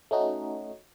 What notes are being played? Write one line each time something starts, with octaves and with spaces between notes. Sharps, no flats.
A3 C#4 D#4 F#4